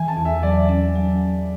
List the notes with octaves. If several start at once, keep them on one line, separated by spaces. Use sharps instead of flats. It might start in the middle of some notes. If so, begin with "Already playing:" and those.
Already playing: E3 G#5
A5
E2
E5
F#3 D5
C#4
F#3